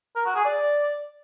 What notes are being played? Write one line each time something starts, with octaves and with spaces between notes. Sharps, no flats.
A#4
F#4
G#4
D5